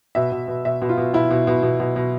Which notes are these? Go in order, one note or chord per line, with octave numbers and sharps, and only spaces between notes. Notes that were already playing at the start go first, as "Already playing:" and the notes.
B2 E5
B2
B2
B2 E5
B2
F4
B2
B2 E4
B2
B2
B2
B2
B2